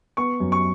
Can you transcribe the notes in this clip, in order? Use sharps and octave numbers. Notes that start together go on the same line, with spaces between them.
B3 C#6
F#2
C#6